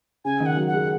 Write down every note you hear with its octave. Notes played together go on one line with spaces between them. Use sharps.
C#3 G#5
D#3
F#5
F#3
F#5
G#3